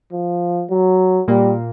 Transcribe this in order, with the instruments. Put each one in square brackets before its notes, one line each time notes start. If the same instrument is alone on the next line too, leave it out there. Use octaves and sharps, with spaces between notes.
[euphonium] F3
F#3
[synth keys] A#2 A#3 [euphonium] G3